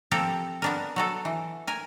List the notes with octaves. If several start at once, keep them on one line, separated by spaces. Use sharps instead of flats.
F3 C4 G4 A4 A#4
B3 D4 A#4
F#3 F#4 A4
E3
A#4 G#5